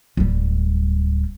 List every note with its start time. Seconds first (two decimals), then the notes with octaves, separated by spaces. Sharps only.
0.17 D1 G3